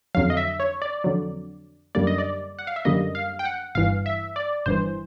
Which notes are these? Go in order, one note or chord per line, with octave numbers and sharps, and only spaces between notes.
F2 D3 F#3 F5
D#5
E5
C#5
D5
F2 D3 F#3
F#2 D3 G3 A#3 D5
D#5
D5
F#5
F5
E5
F#2 D3 G3 A#3 D#5
F5
G5
F#5
G1 G2 E3 F5
E5
D5
G1 G2 E3 C5